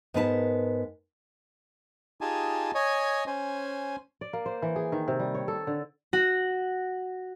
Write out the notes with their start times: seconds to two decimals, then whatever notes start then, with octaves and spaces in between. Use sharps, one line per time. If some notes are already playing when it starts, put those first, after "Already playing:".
0.14 G#2 B3 A#4 B4 G#5 A5
2.21 D#4 F4 G4 G#4 G#5 A5
2.75 C#5 D#5 G#5
3.27 C#4 C5 G#5
4.21 D5
4.33 A#3
4.46 C5
4.62 E3
4.76 G#4
4.92 D#3
5.08 C3
5.20 G3
5.34 C#5
5.48 A4
5.67 D3
6.13 F#4